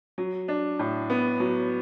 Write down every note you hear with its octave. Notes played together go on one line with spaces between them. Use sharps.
F#3
D4
A2
B3
F#3